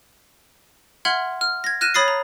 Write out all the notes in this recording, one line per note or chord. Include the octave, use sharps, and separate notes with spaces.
E5 F#5 C6 F6 G#6 F#7
F6
G#6 A#6
F6 F#6 A#6 D#7 E7
C#5 B5 D#6 A6 C7
A#5